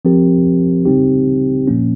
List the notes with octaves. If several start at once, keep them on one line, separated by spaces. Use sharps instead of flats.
F3 C4 G4 A#4
C#3 G3 C4 D#4 G4
A#2 F3 A#3 C#4